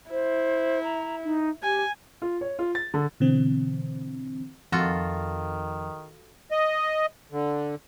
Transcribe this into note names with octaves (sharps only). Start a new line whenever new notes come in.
E4 C5
A#5
D#4
G4 G#5
F4
C#5
F4
A6
D3
B2 D3 E3 C4
F2 D#3 F4 F#4 A4
D#5
D3